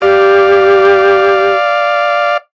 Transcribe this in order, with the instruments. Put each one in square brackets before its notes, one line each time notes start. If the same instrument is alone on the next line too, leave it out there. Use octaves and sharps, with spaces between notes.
[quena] G4 [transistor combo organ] D5 F5